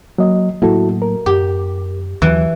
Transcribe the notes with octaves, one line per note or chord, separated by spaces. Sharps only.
F#3 A#3 D#5
A2 F#3 A#3 E4 F#4 A4
A#4
F#2 G4
D#2 E3 F#3